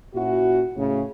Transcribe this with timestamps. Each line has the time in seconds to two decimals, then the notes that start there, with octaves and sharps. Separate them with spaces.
0.15 A#2 C#4 E4 F#4
0.77 A2 C#3